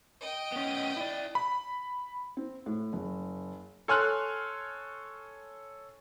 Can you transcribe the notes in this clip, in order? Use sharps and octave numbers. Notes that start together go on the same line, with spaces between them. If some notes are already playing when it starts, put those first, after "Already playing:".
D#5 G5
B3 C#4
E4 D5
B5
C4
A2
F#1
A4 C#5 G#5 C6 F6 F#6